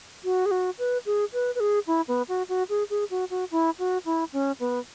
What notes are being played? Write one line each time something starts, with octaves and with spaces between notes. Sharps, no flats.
F#4
G#4
F#4
B4
G#4
B4
B4
G#4
E4
B3
F#4
F#4
G#4
G#4
F#4
F#4
E4
F#4
E4
C#4
B3